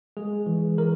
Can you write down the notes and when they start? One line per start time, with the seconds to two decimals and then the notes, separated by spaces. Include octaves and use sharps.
0.17 G#3 G#4
0.46 E3
0.78 E3 A#4